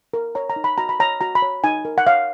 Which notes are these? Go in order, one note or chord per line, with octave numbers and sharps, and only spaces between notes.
A#4
C#5 A#5
A#5
D#4
B5
F#4 A#5
B5
C#5 A#5
F#4 A#5
B5
C#5
D#4 G#5
A#4
F#5
C#5 F5